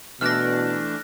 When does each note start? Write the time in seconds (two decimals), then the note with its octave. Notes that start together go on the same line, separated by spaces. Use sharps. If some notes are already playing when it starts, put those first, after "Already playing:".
0.21 B2 E3 A3 D4 F6 F#6 A#6